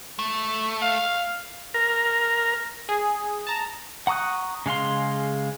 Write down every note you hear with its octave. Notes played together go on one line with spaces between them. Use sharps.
A3
F5
A#4
G#4
A5 A#5
F#5 A#5 C#6 D#6 F#6
C#3 G#3 F5 C6